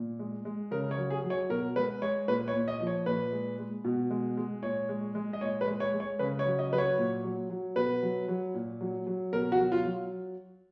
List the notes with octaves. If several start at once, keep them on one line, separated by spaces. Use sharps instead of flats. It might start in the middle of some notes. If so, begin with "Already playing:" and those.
Already playing: A#2
G#3
G#3
C#3 A#4
C#5
F#3
G#4
F#3
C#5
B2 A#4
G#3 B4
G#3 C#5
A#2 B4
C#5
A#2
D#5
F3
C#5
A#2 B4
G#3
G#3
B2
G#3
G#3
A#2 C#5
G#3
G#3
D#5
A#2 C#5
B4
G#3
C#5
G#3
C#5
C#3 B4
C#5
F#3
D#5
F#3 B4
C#5
A#2
F#3
F#3
B2 B4
F#3
F#3
A#2
F#3
F#3
B2 A#4
F#4
F#3
F4
F#3